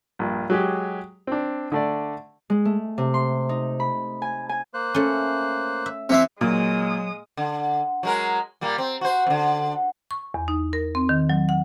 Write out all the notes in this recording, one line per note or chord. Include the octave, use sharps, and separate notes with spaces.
A#1 G2
F#3 G#3 G4
C4 D4
D3 A3 D5
G#3
A3
C3
C6
D#4
B5
G#5
G#5
A#3 C5 F#6
A3 C#4
E5
C3 E3 C4
A#2 F#3 G#3 D#6
D3
F#3 G#3 A#4
A#2 G3 A#3
C4
F#4 C5
F#2 D3
C#6
E2
D#4
A#4
C4
D#3
F#3
F#5